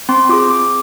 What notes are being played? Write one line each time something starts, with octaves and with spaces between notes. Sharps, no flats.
C4 C6
F4 G#4 D6
C4 D6